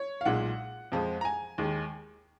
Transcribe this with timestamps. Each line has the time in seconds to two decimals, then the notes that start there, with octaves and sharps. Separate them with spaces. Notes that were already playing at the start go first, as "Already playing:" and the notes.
Already playing: C#5
0.21 F5
0.25 B1 A#2 G#3 F#5
0.92 F2 F3 G#3
1.21 A#5
1.25 G#5
1.58 D#2 D#3 G#3